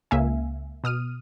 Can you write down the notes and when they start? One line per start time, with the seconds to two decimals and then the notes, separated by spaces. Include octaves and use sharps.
0.11 C#2 A#3 E5 F5 G#5
0.84 B2 D#6 F6 D#7